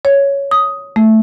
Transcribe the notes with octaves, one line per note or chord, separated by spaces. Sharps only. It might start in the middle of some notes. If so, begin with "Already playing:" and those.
C#5
D#6
A3